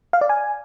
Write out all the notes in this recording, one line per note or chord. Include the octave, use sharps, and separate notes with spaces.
F5
D5
G#5